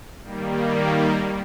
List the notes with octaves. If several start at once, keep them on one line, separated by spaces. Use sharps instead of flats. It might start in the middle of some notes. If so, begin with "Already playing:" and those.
D#3 G3 A#3